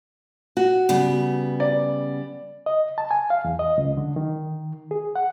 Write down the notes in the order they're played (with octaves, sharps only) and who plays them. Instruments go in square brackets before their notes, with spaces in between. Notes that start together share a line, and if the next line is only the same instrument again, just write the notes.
[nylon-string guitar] F#4
[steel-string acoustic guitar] C#3 G3 B3
[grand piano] D5
[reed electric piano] D#5
A5
G#5
F5
E2
D#5
C#2
D3
D#3
G#4
F#5